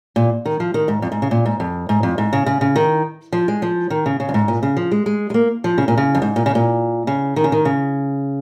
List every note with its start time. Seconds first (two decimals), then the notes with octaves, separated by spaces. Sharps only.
0.16 A#2
0.46 D#3
0.60 F3
0.74 D#3
0.88 G#2
1.02 F2
1.12 G#2
1.22 C#3
1.31 A#2
1.46 G#2
1.60 F2
1.89 G#2
2.03 F2
2.18 G#2
2.33 C#3
2.46 C#3
2.61 C#3
2.76 D#3
3.33 F3
3.48 G#3
3.62 F3
3.90 D#3
4.06 C#3
4.20 C#3
4.29 F2
4.34 G#2
4.48 A#2
4.63 C#3
4.77 F3
4.92 G#3
5.06 G#3
5.30 G#3
5.34 A#3
5.64 F3
5.78 C#3
5.88 A#2
5.97 C#3
6.15 F2
6.22 G#2
6.36 A#2
6.46 C#3
6.55 A#2
7.07 C#3
7.36 D#3
7.44 C#3
7.52 D#3
7.65 C#3